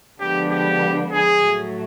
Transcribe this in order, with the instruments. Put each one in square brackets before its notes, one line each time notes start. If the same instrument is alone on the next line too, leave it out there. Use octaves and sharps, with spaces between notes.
[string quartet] D3 F3 G#3 B3 D4 [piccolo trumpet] G4
[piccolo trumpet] G4
G#4
[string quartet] A2 F#3 A3